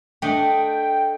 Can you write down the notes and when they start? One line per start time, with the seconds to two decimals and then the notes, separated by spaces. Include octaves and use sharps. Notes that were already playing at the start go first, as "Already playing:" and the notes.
0.22 A3 D4 D#5 G5